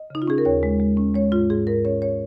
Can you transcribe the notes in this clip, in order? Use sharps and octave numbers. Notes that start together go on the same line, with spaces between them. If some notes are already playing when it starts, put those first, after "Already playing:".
Already playing: D#5
C#3 D#4
F4
C#4 G#4
A#4
D#2 C#5
G#3
G#3
C#4
G#3 C#5
G#2 F4
G#2 G#4
G#2 A#4
C#4 C#5
C#5